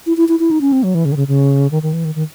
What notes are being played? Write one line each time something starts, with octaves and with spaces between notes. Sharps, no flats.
E4
E4
E4
E4
D#4
C#4
C4
F#3
E3
C#3
D#3
C#3
C#3
D#3
D#3
E3
D#3
D#3